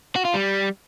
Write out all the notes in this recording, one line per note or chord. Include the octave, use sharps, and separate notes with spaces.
F#4
F4
G3